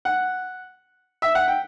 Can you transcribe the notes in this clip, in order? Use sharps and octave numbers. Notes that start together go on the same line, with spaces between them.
F#5
E5
F#5
G5